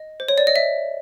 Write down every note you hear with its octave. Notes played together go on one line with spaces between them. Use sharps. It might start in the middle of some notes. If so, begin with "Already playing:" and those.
Already playing: D#5
C5
C#5
D5
D#5
E5